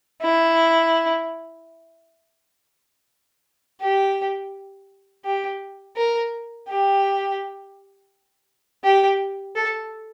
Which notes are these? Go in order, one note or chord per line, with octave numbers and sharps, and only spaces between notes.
E4
G4
G4
A#4
G4
G4
A4